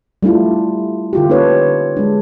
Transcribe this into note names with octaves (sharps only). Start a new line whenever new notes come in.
G3 A3 D4 E4 F4
D3 F4 G4
A#3 C#4 D#4 A4 B4 C#5
G#3 D4